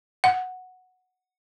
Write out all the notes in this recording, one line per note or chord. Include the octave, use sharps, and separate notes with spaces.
F#5